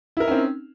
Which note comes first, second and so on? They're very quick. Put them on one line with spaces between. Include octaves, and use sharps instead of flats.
E4 A#4 D#4 C#4 C4